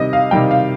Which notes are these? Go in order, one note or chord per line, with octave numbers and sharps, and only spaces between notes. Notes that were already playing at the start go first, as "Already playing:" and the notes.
Already playing: C3 D#3 G3 D#5
F5
C3 D#3 G3 G5
F5